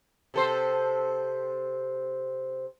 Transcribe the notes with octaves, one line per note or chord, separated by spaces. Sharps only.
C3 A4 C5